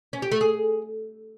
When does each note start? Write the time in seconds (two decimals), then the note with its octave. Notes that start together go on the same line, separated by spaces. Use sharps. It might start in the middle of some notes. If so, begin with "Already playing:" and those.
0.13 C#4
0.22 G4
0.32 A3
0.41 G#4